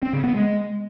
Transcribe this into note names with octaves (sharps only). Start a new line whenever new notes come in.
C4
C#3
B3
G#3